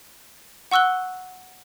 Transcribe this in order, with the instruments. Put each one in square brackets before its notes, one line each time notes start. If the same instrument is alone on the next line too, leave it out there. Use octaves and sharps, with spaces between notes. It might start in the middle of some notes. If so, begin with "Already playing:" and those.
[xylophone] F#5 C#6 E6 F#6 G7